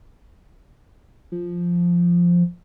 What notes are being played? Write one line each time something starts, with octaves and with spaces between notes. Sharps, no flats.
F3